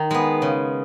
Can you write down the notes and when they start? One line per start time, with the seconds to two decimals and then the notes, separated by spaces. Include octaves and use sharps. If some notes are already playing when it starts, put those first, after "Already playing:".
Already playing: D#3
0.11 G#3 B3
0.42 C#3